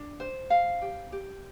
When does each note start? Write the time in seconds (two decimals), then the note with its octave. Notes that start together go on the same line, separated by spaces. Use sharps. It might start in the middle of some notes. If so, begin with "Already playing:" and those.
Already playing: D4
0.20 C5
0.50 F5
0.82 G4
1.12 G4